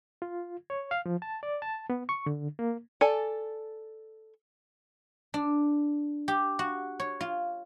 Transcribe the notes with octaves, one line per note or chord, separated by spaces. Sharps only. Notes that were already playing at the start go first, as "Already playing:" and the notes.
F4
C#5
F5
F3
A5
D5
A5
B3
C#6
D3
A#3
A4 D5 G#5
D4
G4
F#4
C#5
F4